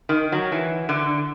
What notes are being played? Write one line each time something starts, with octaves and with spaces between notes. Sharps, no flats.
D#3
F#3
E3
D3